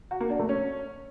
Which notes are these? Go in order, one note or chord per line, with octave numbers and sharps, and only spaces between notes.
F#4
A#3
D4
A3
C#4